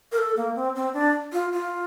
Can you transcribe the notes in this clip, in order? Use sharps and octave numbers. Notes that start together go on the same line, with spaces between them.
A#4
A4
A#3
C4
C4
D4
F4
F4